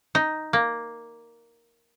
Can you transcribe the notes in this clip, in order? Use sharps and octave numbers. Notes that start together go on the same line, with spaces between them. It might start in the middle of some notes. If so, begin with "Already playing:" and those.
D#4
A#3